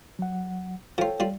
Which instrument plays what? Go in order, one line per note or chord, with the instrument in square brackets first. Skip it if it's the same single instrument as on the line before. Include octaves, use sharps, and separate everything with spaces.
[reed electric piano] F#3 F#5
[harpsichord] F3 F4 [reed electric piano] A4 C#5 G5
[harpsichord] G3 F4